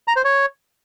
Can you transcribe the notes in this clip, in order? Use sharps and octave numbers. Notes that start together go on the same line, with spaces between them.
A#5
C5
C#5